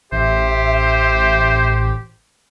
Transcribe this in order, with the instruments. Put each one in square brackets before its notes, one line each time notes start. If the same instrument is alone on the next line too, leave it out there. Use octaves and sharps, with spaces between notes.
[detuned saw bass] A1 [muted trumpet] G4 [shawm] C5 [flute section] E5